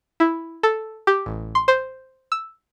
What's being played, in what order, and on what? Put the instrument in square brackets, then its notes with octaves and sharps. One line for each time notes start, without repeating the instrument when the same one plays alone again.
[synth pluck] E4
A4
G4
A1
C6
C5
E6